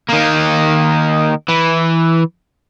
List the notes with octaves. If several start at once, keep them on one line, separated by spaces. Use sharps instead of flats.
D#3 A#3
E3